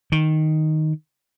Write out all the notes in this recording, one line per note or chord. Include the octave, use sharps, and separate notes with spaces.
D#3